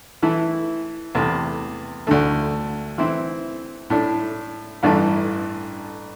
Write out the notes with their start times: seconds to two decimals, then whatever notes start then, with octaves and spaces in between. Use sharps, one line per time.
0.22 E3 A3 E4
1.15 E2 C3 A3
2.07 D2 D3 A3
2.98 E3 C4 E4
3.90 A2 A3 D4
4.83 A1 G2 E3 A3